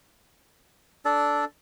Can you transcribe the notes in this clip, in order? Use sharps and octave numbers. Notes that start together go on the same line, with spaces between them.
D4 A4 D5